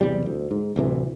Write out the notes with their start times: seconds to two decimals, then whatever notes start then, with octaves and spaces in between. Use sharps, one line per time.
0.01 B1 E2 C3 G3
0.26 D2
0.51 G#2
0.76 D1 D2 C3 E3